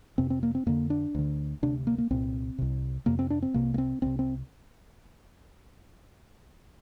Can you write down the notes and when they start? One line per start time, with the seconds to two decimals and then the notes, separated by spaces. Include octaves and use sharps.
0.18 F2 C3 C4
0.30 C4
0.43 A#3
0.55 C4
0.66 F2 D3 A#3
0.90 D4
1.15 D2 D3
1.62 D2 C3 D4
1.87 A#3
1.98 A#3
2.10 C2 A#2 C4
2.58 C2 C3
3.06 F2 C3 A#3
3.19 C4
3.30 D4
3.42 C4
3.54 C2 C3 A#3
3.74 A#3
3.78 C4
4.02 C2 C3 C4
4.19 C4